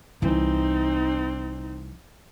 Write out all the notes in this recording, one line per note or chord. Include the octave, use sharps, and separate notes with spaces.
C2 E3 C4 D#4